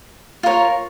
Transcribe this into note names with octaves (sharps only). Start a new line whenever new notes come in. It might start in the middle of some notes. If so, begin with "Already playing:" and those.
F4 A#4 C#5